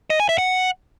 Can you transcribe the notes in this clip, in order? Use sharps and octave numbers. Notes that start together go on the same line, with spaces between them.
D#5
G#5
E5
F#5